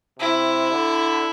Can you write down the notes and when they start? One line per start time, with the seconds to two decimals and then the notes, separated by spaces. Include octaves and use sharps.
0.19 C3 E4
0.72 D3